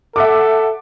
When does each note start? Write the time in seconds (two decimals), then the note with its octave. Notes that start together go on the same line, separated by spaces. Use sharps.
0.16 A4 E5 F#5 D6